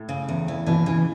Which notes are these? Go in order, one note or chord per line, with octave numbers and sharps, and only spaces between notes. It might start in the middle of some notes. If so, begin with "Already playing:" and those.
Already playing: A2
C#3
E2
E3
B2 E3
C#3 E3